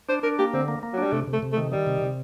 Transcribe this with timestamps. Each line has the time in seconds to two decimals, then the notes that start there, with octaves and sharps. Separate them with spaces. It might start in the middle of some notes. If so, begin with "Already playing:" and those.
0.09 D4 C5
0.23 D4 A#4
0.39 A#3 G4
0.53 D3 C4
0.68 A#3
0.83 A#3
0.93 F#3 D4
1.03 G3
1.12 C3 A3
1.27 C3
1.33 A3
1.43 C3
1.53 A3
1.57 D#3
1.72 D#3 G3
1.87 C3
2.02 C3